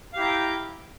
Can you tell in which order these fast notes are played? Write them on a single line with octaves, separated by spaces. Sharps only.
F5 G4 E4 A#5 G5